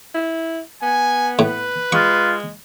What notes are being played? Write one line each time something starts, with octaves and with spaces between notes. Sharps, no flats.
E4
B3 G#5
A2 B4
G#3 F4 C#6